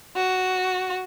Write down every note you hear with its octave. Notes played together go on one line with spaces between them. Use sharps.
F#4